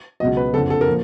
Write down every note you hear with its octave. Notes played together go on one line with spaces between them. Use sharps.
C#2 B2 F#3 D#5
B4
F#1 F2 D3 A4
A4
A#4
A#2 F3